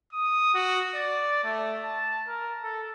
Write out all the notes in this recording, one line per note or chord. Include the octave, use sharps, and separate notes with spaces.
D#6
F#4
D5
A3
A5
A#4
A4